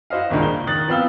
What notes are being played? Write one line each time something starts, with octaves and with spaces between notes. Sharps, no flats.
E4 F#4 C5 D#5 F5
C#2 G2 A#2 D#3
G7
D#3 D#6 F#6 A6 F#7
F3 B3 C4 F5 E6 G7